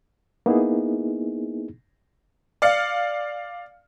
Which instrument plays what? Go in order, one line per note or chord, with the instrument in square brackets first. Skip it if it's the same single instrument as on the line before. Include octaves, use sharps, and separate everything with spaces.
[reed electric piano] A#3 B3 D#4 E4 G#4
[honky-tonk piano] D5 F5 C#7